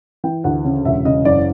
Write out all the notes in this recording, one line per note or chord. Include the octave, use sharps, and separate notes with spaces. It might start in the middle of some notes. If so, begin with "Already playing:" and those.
E3 G5
D2 F#5
C#3
E1 E5
C#3 D#5
F#1 D5